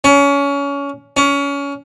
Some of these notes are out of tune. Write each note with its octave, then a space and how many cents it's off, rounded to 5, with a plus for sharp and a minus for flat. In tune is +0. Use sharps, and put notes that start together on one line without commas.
C#4 +25
C#4 +25